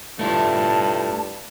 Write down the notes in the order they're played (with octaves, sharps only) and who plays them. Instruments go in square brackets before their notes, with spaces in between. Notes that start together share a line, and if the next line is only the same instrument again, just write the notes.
[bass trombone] G2 [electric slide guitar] A3 E4 F4 [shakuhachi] A5